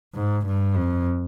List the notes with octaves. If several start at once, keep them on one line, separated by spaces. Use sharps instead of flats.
G#2
G2
F2